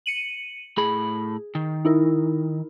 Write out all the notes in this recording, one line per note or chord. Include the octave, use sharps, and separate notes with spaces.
C#7 D#7 F#7
A2 G#4 B5
D#3
D#4 E4 A#4